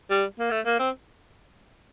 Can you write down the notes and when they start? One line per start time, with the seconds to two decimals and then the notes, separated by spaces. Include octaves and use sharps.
0.10 G3
0.39 A#3
0.51 A3
0.66 A#3
0.79 C4